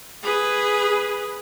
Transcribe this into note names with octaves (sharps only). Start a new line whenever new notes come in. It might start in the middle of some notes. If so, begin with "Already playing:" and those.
G#4 B4